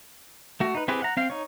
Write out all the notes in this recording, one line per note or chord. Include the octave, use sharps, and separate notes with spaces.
A3 F#4
D#4 B4
C4 E4 G4 G#4 B4
F#5 A#5
C4 F5 G5
D#4 C#5